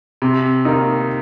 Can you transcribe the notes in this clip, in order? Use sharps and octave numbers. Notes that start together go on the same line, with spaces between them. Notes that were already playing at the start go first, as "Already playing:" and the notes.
C3
D#3 A#3 D#4